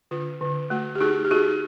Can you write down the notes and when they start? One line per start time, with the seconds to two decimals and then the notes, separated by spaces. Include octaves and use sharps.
0.11 D3 F4
0.41 D3
0.70 A3 F#4
0.95 G4
1.01 D#4 F#4 G#4
1.25 G4
1.31 D#4 F#4 G#4